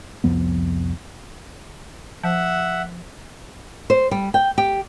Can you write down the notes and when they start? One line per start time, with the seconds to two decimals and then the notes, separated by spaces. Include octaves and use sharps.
0.24 C2 F2 F3 B3
2.23 F3 E5 F#5
3.90 C5
4.11 G3
4.34 G5
4.58 G4